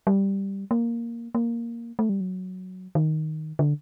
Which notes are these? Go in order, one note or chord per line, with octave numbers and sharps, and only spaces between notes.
G3
A#3
A#3
A3
G3
F#3
D#3
D3